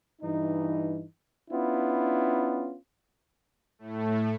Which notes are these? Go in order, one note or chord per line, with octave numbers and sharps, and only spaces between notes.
G2 E3 D#4
B3 C#4 D4 E4 F4
A2 A3